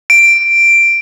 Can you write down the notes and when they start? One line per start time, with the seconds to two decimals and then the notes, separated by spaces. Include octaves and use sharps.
0.10 D7